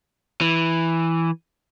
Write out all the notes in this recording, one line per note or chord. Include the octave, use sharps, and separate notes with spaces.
E3